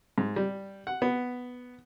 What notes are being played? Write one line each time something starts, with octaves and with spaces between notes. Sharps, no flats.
G#2
G3
F#5
B3